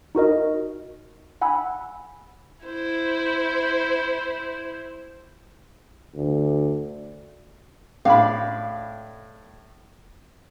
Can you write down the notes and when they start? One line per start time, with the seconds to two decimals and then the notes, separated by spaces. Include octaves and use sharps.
0.15 D#4 F#4 A#4 D#5
1.42 F#5 G#5 B5 E6
2.65 E4 C5
6.15 D2
8.05 A2 D4 F5 B5